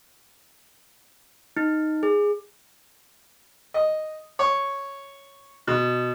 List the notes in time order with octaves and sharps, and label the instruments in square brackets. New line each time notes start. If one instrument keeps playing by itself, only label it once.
[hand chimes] D#4
G#4
[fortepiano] D#5
C#5
B2